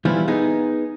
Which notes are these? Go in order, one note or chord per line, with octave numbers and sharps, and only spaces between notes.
E3 F3 G3 B3 E4 F4
B3 D#4 G#4